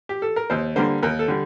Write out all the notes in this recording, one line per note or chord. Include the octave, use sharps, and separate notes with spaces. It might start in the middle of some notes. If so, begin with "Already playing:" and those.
G4
A4
A#4
D#2 C5
D3 G3 A#3 D4 C5
D#2 A#4
A4
D3 G3